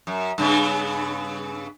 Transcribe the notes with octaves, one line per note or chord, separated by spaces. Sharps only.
F#2
G2 C#3 B3